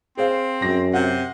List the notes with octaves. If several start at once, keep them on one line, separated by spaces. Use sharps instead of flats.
C4 G#4 C5 F5
F#2 A#6
C3 F#5